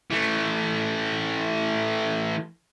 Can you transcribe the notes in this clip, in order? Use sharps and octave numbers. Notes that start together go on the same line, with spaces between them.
E3 A3